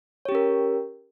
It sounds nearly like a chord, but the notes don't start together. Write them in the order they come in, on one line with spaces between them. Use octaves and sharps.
C#5 G4 C#4 A#4